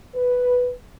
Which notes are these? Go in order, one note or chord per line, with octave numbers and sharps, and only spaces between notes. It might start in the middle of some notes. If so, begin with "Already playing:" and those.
B4